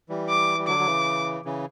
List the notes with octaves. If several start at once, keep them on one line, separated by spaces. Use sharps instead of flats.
E3 G3
D6
G3
D3 F#3 D6
F#3
C#3 E3
C#3 E3